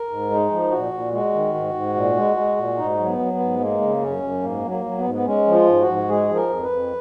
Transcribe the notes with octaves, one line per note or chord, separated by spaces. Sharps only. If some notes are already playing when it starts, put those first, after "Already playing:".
Already playing: A#4
G#2
G#3 D#4
F3
A#2 F#4
A#2
G#3 F#4
D#3
G#2
G#2
A#2
G#3
G#3
A#2
G#2 D#4
F#3
B3
F#3
B3
G#2
G#3 A#3
C#3
F#2 C#4
F#2
G#2 A#3
F#3
A#3
F#3
B3
G#2
B3
G#3 C#4
F3
F4
G#2
F#4
G#2
G#3 G#4
F3
A#4
F2
B4
F2